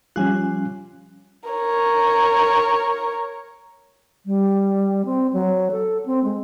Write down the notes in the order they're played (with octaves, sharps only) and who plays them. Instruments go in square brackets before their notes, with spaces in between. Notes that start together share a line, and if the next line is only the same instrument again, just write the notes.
[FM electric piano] F3 G3 F4 [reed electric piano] C#4 G#5 F#6
[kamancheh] A#4 C#5
[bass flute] G3
C4
F#3
A4
C4
G#3